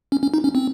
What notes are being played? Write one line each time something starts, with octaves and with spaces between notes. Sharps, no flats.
C#4
C#4
D#4
C#4
C4